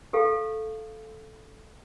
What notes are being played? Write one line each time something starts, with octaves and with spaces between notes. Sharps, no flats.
G4 A4 F5